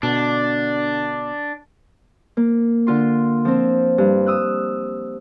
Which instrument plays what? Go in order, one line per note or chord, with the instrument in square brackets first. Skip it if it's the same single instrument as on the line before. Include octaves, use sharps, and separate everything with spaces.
[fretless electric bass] B2 [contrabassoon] D3 [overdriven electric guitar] D4
[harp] A#3
D3 F4 C6
F3 C4
G2
D#6 E6 F#6